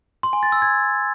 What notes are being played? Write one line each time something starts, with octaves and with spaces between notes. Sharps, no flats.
C6
G#5
A6
E6
G#6